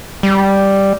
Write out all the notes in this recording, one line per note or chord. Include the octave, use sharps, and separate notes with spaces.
G3